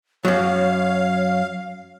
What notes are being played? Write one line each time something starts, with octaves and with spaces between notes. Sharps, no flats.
F#2 F#3 C#5 F5